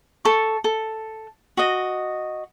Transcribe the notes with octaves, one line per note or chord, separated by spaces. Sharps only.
A4 C#6
A4
F#4 D#5